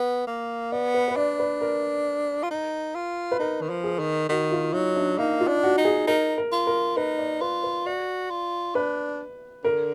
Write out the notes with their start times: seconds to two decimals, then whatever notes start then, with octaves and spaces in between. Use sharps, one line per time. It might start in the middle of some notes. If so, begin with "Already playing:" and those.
Already playing: B3
0.27 A#3
0.72 B3 D5
0.94 B4
1.08 B4
1.16 D4 D5
1.39 B4
1.61 A#4
2.43 F4
2.51 D#4
2.95 F4
3.32 B4
3.39 D#4 A#4
3.62 D#3
3.69 F3
3.84 G#4
3.99 D#3
4.29 D#3 F#4
4.52 F4
4.73 F#3 D#4
4.96 D4
5.18 A#3 D#4
5.41 F4
5.48 D4
5.63 F#4
5.78 D#4
5.85 G#4
6.07 D#4 A#4
6.38 A#4
6.52 F4
6.67 A#4
6.97 D#4 B4
7.19 D5
7.41 F4 B4
7.64 B4
7.86 F#4 D5
8.30 F4
8.75 D4 B4
9.64 D3 A#4